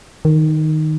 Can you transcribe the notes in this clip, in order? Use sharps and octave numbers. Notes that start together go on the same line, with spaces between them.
D#3